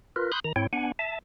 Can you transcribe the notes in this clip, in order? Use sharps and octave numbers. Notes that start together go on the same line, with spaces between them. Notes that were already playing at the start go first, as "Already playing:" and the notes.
F4 A#4 B4
B5 C6 D#6 F#6 G6
D#3 A#5
G#2 C4 E4 C#5 G5
B3 D4 F#5 G#5
E5 A5